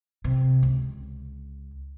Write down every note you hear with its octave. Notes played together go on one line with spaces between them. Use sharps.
C3
C#2